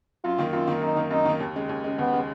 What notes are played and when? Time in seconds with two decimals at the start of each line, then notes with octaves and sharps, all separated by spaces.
0.24 F#2 F4
0.38 D#3 A#3
0.53 F#2 F4
0.67 D#3 A#3
0.82 F#2 D#4
0.97 D#3 A#3
1.11 F#2 D#4
1.25 D#3 A#3
1.40 D#2
1.55 C#3 G#3
1.69 D#2
1.84 C#3 G#3
1.99 D#2 B3
2.13 C#3 G#3